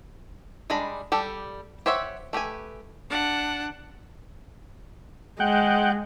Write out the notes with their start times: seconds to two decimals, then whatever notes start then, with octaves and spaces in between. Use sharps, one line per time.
0.70 G3 G#3 D4 A#5 B5
1.12 G3 G4 A4
1.86 G4 C5 C#5 E5 F#5
2.33 A3 G4 B4 G#5
3.10 D4 F#5
5.40 G#3 F#5 G5